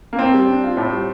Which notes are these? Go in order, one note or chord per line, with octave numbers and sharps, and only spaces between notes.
A#3
A2 C4
G3
D4
F4
A2
G3